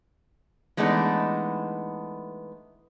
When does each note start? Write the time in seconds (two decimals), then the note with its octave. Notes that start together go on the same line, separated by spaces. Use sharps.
0.77 E3 G#3 A3 B3 D4 D#4